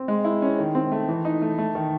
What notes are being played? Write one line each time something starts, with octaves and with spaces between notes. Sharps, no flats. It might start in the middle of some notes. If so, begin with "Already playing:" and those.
Already playing: C4
G#3
E4
C#4
D#3
C4
A3
E3
D#4
A3
A3
D#3